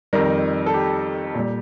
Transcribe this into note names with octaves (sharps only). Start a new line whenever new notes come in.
F2 D#3 G3 A#4
A4
G4
A#2 G3